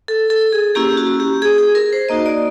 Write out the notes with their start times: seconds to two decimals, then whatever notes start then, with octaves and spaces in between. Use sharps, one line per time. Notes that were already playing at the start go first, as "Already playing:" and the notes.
0.08 A4
0.30 A4
0.52 G#4
0.75 A#3 C#4 E4 G4
0.97 F#4
1.20 G4
1.42 G#4
1.58 G#4
1.75 A#4
1.93 C5
2.09 A#3 D#4 F#4 D#5
2.26 D5